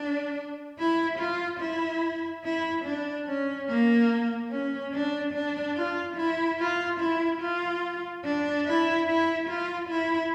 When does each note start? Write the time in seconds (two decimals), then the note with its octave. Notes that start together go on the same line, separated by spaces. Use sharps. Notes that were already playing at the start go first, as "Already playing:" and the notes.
Already playing: D4
0.78 E4
1.19 F4
1.61 E4
2.44 E4
2.85 D4
3.27 C#4
3.69 A#3
4.51 C#4
4.93 D4
5.34 D4
5.76 F4
6.17 E4
6.59 F4
7.00 E4
7.41 F4
8.25 D4
8.66 E4
9.08 E4
9.49 F4
9.90 E4